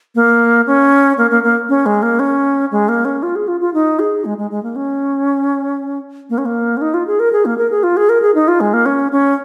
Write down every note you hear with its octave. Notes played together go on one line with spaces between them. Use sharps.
A#3
C#4
A#3
A#3
A#3
C#4
G#3
A#3
C#4
G#3
A#3
C#4
F4
G#4
F4
F4
D#4
G#4
G#3
G#3
G#3
A#3
C#4
A#3
C#4
A#3
C#4
D#4
F4
G#4
A#4
G#4
A#3
A#4
G#4
F4
G#4
A#4
G#4
D#4
F4
G#3
A#3
C#4
C#4